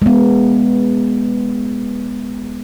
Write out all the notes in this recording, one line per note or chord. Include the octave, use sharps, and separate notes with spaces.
G#3 B3